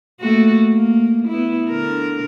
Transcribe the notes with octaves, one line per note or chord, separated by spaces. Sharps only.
A3 A#3 F#4
A#3
B3 E4
D3 A#4